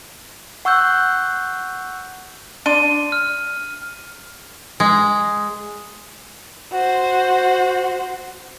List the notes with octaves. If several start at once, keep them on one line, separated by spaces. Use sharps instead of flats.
F#5 C#6 E6 F#6 G6
D4 C6 D#7
F6
G#3
F#4 C5